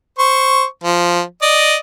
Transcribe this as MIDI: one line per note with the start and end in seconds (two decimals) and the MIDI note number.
0.19 0.64 72
0.19 0.64 85
0.84 1.21 53
1.42 1.76 74
1.42 1.76 75